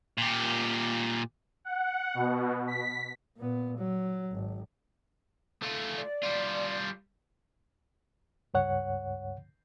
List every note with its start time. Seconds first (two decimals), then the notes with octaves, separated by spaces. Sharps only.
0.18 A#2 G4
1.65 F#5
2.14 B2
2.67 B6
3.37 A#2 B3
3.77 F#3
4.32 G#1
5.62 A3 F4
5.95 D5
6.23 G3 F4
8.54 C#2 G2 C#5 F#5